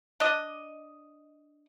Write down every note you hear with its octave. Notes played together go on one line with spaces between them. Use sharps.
D4 D#5